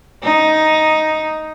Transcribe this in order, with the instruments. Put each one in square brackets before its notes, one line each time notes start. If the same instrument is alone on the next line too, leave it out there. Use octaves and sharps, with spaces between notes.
[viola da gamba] D#4